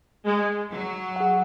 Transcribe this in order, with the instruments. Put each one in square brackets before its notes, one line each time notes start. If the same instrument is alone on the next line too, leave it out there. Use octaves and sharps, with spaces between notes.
[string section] G#3
F#3
[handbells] G#4 F#5